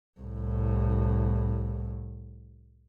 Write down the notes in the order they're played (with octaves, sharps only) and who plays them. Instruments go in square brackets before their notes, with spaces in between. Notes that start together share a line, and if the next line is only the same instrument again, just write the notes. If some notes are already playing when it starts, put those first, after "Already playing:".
[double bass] C2 A2